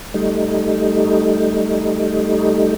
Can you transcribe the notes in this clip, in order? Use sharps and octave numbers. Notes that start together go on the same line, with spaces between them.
G3 A3 D#4